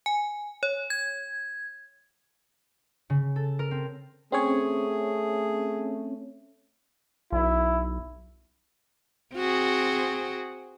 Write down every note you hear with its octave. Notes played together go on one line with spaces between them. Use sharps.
G#5
C#5
G#6
C#3
A4
A#4
C4
A3 C4 C#4 G#4 C#5
B1 E4
C4 F#4 G#4